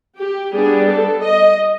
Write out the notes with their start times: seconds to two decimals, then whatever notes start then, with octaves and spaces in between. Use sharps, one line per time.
0.18 G4
0.53 G3 B3 D4 G#4
0.88 A4
1.22 D#5